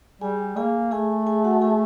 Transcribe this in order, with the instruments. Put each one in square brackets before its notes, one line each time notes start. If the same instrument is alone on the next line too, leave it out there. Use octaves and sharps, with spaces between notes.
[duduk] G3 [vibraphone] G#4 G#5
[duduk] A#3 [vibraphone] G#4 G#5
[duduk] A3 [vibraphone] G#4 G#5
[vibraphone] G#4 G#5
F#4 F#5
G#4 G#5